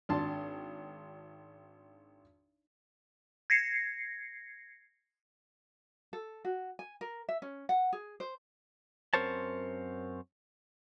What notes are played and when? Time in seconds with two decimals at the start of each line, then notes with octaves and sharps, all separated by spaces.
0.09 G#1 D4 A5 C6
3.50 G#6 A#6 C7 C#7
6.13 A4
6.45 F#4
6.79 G#5
7.01 A#4
7.29 E5
7.42 C#4
7.69 F#5
7.93 G#4
8.20 C5
9.14 F#2 C4 A#4 C5 C#5 A5